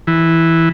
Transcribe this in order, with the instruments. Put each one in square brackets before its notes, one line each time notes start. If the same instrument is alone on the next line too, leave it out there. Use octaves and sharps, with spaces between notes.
[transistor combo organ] E3